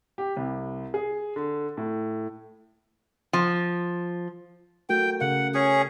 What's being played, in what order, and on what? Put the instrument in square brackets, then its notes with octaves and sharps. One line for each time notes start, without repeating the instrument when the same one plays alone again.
[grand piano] G4
C2
G#4
D3
A2
[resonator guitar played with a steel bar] F3
[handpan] A3 F#4 A#4 [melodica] G5
[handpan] C#3 A#4 F5 [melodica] F#5
[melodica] C#4 G#4